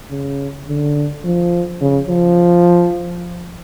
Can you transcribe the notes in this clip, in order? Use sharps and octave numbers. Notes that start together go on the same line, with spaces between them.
C#3
D3
F3
C#3
F3